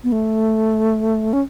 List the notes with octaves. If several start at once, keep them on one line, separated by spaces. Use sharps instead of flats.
B3
A3
C#4